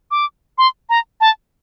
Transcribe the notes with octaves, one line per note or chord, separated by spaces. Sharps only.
D6
C6
A#5
A5